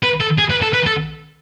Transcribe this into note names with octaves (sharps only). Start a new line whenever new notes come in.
B4
A4
G#4
B4
A4
B4
A4